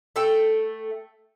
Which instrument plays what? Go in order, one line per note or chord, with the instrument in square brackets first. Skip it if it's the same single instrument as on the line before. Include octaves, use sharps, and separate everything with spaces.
[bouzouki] A3 A4 G5